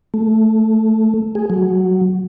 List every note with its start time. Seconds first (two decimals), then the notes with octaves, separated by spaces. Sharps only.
0.14 A3
1.35 G#4
1.50 F#3